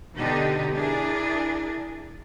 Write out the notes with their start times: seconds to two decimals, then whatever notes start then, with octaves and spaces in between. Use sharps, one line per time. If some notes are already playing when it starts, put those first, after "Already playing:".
0.16 B2 D3 D4 D#4 G4
0.74 D4 E4 G#4 A#4